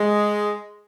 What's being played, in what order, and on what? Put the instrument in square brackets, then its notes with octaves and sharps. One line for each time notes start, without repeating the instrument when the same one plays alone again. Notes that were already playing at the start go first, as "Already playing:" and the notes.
Already playing: [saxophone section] G#3